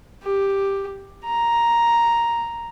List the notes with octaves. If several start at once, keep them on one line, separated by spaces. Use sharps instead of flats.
G4
A#5